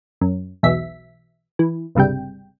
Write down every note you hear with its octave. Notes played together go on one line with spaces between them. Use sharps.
F#2
B1 E2 E5 B6
E3
G1 C#2 G2 C3 G5